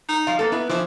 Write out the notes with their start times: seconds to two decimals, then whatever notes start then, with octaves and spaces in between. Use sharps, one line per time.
0.09 D#4
0.27 F3 G3 F5
0.39 A#3 B3 A4
0.52 B3 E4
0.69 E3 F3 D4 E4